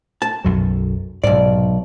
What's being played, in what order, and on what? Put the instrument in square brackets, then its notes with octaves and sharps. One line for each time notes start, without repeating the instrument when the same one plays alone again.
[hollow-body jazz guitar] A5
[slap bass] B1 F#2 F#3
[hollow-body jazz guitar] B1 D5 [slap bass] G#2 C3